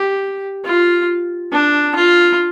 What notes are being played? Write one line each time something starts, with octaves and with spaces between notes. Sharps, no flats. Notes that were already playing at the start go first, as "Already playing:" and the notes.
Already playing: G4
F4
D4
F4